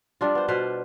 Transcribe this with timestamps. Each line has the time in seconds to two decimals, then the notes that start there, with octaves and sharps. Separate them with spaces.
0.21 G3 D4 F4
0.35 B3 C5
0.48 B2 B4 C5 F5